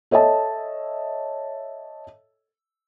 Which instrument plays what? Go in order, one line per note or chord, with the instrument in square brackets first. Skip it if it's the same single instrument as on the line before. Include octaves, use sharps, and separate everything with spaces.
[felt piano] A4 C#5 D#5 E5 A5